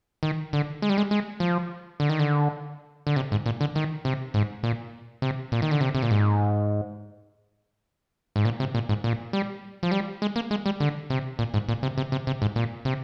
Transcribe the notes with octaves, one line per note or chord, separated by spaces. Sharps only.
D#3
D3
G#3
G3
G#3
G#3
F3
D3
D#3
D3
D3
C3
G#2
A#2
D3
D#3
C3
G#2
A#2
C3
A#2
D#3
D3
C3
C3
A#2
G#2
G#2
A#2
C3
A#2
G#2
A#2
G3
F3
G3
G#3
A#3
G#3
G3
D3
C3
A#2
G#2
A#2
C3
C3
C3
C3
G#2
A#2
C3